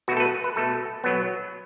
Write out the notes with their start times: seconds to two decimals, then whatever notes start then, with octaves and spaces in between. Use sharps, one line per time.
0.08 B2 F#4
0.12 A3
0.17 A4
0.20 B4
0.44 B4
0.56 B2 A3 A4
1.04 B2 F#3 B3